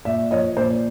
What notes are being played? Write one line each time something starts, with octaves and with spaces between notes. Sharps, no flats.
A#2 D5 E5
F3 C#5 D#5
A#2 C5 D5